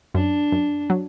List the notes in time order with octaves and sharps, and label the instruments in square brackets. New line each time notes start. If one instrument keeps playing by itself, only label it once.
[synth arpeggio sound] F#2 [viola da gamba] D4
[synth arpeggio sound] F#2
F#3